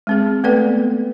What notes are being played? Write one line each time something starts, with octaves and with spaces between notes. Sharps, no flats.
G#3 C4 G#4
A3 B3 A4 B4 D5 G5